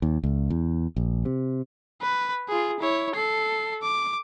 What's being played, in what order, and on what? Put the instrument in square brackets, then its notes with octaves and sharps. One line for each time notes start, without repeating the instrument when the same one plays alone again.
[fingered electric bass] D#2
C#2
E2
A#1
C3
[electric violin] B4
F4 G#4
E4 C#5
A4 C7
D6